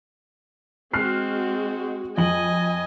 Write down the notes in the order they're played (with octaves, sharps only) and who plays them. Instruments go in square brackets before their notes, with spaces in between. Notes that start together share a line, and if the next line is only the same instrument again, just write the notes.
[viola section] G#3 F#4 [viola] C4 [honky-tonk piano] F6 F#6 C7
[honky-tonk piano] F2 F#7 [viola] D#5 G#5